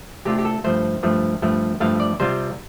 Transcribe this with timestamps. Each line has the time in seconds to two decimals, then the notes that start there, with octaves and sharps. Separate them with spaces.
0.25 C3 A3 D4 F4 G4
0.38 G4
0.45 A4
0.64 G2 F3 A3 C5
1.03 G2 F3 A3
1.42 G2 F3 A3
1.80 G2 F3 A3 F5
2.00 D5
2.20 C3 G3 F4 C5